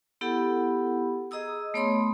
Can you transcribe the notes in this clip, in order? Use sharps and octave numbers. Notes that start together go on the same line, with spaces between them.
B3 E4 G4 A4 F#5 B5
G#4 D#5 A#5 D#6 E6
A3 B3 C#5 B5 C6 D#6